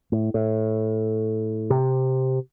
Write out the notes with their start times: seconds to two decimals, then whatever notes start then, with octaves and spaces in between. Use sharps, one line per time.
0.12 A2
0.34 A2
1.70 C3